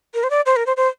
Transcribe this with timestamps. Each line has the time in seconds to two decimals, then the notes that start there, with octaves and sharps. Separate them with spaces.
0.14 A#4
0.23 C5
0.30 D5
0.46 C5
0.56 A#4
0.66 C5
0.77 C5